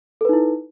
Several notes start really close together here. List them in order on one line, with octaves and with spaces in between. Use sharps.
A4 B4 D#4 E4